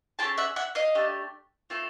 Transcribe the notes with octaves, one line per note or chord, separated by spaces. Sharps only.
A3 C#4 F4 G#4 G5 A5
E5 F#5
E5 F#5
D#5 F5
A3 D4 G4
A3 C4 F4 A4